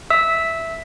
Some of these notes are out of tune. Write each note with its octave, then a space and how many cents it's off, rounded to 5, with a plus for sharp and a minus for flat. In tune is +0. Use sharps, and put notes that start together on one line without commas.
E5 +0 E6 -15